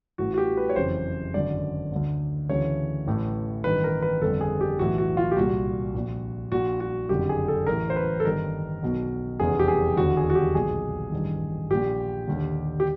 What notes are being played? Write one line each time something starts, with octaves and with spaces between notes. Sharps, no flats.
A1 A2 E3 F#4
F#4
G4
B4
C#5
F#1 F2 C#3 E3 C5
G#1 F#2 D3 D5
D2 D3
D2 C#3 E3 C#5
A1 A2 E3
A1 G2 D#3 B4
A#4
B4
G1 F2 D3 A4
G#4
G4
B1 A2 E3 F#4
F#4
F4
G4
C2 A#2 F#4
A#1 A#2
A#1 A#2 F#4
F#4
F#1 F2 D3 G4
G#4
A4
A1 A2 E3 A#4
C5
B4
A4
G1 G2 D#3 A#4
B1 B2
F1 E2 C#3 E3 G#4
G4
G#4
E1 D#2 D3 F#4
G#4
F#4
G4
B1 A#2 G#4
A1 G2 D#3
A#1 A#2 G4
D#2 D3
G4